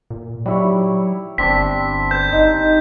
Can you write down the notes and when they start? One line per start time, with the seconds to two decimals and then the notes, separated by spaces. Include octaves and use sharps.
0.10 A#2
0.46 F#3 G3 E4 C#5
1.38 G1 C4 D4 A5 B6
2.11 C5 G6
2.32 D#4